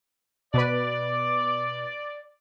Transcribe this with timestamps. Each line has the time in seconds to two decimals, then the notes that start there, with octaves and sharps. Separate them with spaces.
0.54 B2 B4 D5